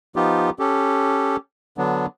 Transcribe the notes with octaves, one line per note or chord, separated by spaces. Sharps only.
F3 B3 D#4 F4 G4
C#4 G4 A4
D3 F#3 B3 D4